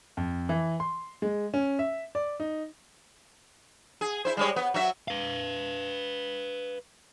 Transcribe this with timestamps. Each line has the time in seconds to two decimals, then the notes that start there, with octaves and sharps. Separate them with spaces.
0.17 F2
0.49 E3
0.80 C6
1.22 G#3
1.54 C#4
1.79 E5
2.15 D5
2.40 D#4
4.01 G#4
4.25 E4 C5
4.37 G3 G#3 C#5
4.56 B3
4.74 F#3 F#4 E5
5.08 B4 F5